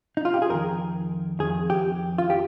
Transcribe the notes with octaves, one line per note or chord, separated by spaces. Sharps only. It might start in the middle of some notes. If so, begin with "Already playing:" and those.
D#4
F4
G4
G#4
F2 D#3 A#4
F2 D#3 G#4
G4
F4
G4